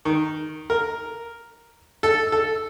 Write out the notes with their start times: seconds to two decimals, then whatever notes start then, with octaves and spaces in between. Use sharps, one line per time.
0.05 D#3
0.70 A#4
2.03 A4
2.32 A4